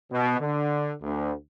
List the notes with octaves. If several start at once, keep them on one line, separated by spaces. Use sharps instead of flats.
B2
D3
D2